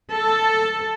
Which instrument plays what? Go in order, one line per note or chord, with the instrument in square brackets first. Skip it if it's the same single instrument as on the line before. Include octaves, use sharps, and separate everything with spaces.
[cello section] A4